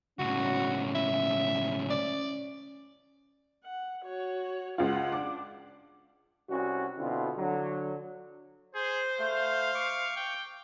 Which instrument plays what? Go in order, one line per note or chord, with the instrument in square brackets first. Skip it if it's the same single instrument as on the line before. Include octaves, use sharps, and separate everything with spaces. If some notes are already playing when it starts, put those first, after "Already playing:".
[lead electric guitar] C#2 A2 [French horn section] C#4 [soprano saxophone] F#4
[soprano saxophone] E5
D5
[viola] F#5
F#4 C#5
[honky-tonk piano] C#2 F4 [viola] F#5
[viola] D4 [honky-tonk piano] D6
[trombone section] C2 C#4 F#4
B2 D3 C4 E4 F4
D3 F#3
[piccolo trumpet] G#4 [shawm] C5
[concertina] A3 [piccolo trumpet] F5
[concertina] C#6 D6
[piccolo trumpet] G5